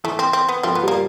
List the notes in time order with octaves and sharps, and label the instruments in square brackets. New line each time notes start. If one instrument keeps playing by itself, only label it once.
[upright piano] E3 [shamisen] A3
[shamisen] C4
C4
B3
[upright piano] F3 [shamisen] C4
[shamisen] B3
[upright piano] G3
[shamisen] A#3